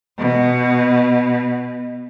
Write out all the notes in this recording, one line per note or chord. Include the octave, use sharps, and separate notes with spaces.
B2